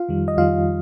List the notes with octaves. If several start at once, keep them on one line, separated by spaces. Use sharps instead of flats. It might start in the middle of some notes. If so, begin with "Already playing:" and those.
Already playing: F4 F5
F2 D#3 G3
D#5
F2 D#3 G3 F4 F5